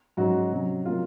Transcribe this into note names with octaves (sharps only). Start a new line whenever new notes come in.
G#2 F#3 C#4 F#4
C3 F#3 C#4
C3 F#3 A#3 F4